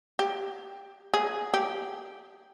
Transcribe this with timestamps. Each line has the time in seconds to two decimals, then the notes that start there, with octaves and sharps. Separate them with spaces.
0.19 G4
1.14 G#4
1.54 G4